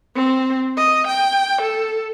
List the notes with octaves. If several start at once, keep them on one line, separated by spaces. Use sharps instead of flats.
C4
D#5
G5
A4